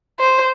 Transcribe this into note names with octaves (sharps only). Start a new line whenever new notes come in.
C5